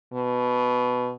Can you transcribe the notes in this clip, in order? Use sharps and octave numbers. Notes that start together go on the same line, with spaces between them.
B2